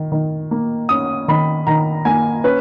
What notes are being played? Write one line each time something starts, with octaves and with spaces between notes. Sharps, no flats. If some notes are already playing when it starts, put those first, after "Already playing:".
Already playing: D#3
D#3
A#3
C#4 D#6
D#3 B5
D#3 A#5
A#3 G#5
C#4 B4